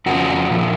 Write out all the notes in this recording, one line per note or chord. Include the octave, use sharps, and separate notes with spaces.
F2 C#3 F3 F#4
A#2 F3